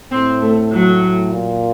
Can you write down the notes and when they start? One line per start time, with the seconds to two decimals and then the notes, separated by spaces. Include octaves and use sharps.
0.11 A2 C4
0.41 A3
0.72 F#3
1.32 A#2